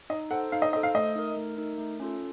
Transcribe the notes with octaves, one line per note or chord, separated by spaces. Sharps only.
D#4 D#5
A4 C5 F#5
D#4 F5
D#5
A4 C5 D#5
F5
A3 D#5
D#4 A#4
A3
D#4 A#4
A3
C#4 F4 A4